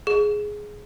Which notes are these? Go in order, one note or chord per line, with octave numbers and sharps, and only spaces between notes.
G#4